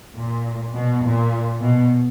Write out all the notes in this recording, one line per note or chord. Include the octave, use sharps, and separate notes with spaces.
A#2
B2
A#2
B2